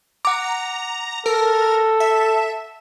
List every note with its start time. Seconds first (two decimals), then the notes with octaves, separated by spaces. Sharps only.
0.25 F#5 A#5 D6
1.26 A4 A#4
2.00 E5